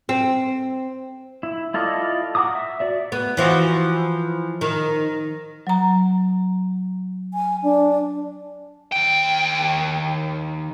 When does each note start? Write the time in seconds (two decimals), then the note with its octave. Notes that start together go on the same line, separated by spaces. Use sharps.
0.09 C4
1.43 E4
1.74 E4 F4 A4 D5 D#5
2.35 F#4 F#5 A#5 D6 D#6
2.55 E5
2.80 F#4 D5 E5
3.12 B3
3.37 E3 F3 F#4
4.61 D#3
5.67 F#3 A#5
7.34 G#5
7.63 D4
8.92 D#2 G5